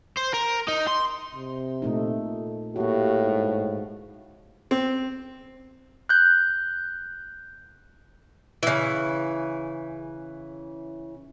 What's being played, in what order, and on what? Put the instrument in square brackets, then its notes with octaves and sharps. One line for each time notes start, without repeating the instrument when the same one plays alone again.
[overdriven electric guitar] C5
A#4
D#4
C6
[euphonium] C3
[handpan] A#2 A3 D#4
[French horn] A2 [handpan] A#3 F#4 [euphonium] G4
[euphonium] G#2
[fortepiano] C4
[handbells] F#6 G6
[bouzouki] C#3 E3